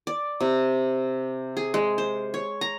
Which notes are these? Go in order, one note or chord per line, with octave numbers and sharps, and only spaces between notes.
D5
C3
G#4
G#3
C5
C#5
A#5